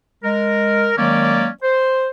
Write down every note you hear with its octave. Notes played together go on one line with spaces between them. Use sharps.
G#3 A#4
D#3 F#3 G#3 A#3 C#4 D5
C5